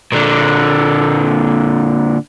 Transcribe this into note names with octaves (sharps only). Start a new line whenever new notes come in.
A#2 D3